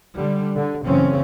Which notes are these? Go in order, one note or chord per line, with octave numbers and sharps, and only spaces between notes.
D3 G3
D3
F#1 C#3 E3 C4 C#4